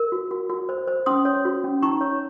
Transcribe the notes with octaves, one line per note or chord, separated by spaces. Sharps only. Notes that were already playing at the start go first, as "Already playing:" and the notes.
Already playing: A#4
F#4
F#4
F#4
C5
C5
C#4 C6 D#6
C#5
F#4
C#4
D#4 A#5 C#6
C#5